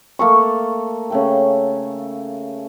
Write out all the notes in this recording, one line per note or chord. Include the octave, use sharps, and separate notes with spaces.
A3 A#3 A4 C#6
C#3 A3 G5